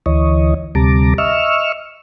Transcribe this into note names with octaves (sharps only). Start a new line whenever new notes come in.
D2 E3 C#5 D#5
D2 C3 G3 A5 A#5 D6
D#5 E5 C#6 E6 F6